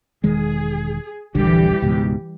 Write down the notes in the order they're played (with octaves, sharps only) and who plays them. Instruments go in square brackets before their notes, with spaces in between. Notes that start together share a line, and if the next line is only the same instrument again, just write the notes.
[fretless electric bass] E1 D#3 G#3 [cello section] G#4
[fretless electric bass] D#1 A#1 D3 [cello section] E3 G3 G4
[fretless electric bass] C#2 G#2 B2